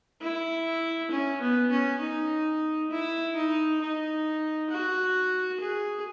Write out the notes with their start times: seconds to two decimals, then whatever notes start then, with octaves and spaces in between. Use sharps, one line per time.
0.21 E4
1.11 C#4
1.42 B3
1.71 C#4
2.01 D#4
2.91 E4
3.36 D#4
3.81 D#4
4.70 F#4
5.60 G#4